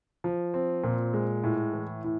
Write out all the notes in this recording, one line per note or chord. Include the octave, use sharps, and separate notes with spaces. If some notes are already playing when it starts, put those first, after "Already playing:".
F3
C4
A#2
G#3
A2
E3
A2